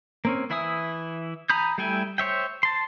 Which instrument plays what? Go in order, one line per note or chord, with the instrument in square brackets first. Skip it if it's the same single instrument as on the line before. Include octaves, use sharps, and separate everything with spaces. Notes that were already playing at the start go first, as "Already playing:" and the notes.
[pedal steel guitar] A#3 C4 C#4
E3 E4 E5 G#5 D#6
G#5 A#5 B5 D#6 G6
G3 A3 E4 G5 G#5
C5 C#5 E5 G5
A5 C6